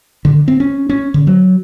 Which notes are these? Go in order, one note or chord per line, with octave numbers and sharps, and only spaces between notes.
D3
C4
C#4
C#4
D3
F#3